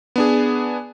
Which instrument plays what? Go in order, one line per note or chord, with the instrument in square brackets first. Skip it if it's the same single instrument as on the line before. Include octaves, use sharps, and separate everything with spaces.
[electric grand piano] B3 D4 G#4